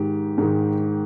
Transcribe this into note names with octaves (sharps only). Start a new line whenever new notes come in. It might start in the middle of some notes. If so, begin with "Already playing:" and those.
Already playing: G#2 D#3 G4
G#2 D#3